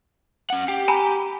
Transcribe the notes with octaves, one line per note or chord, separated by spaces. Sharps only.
C#4 F#5
G4 G5
G#5 A#5 B5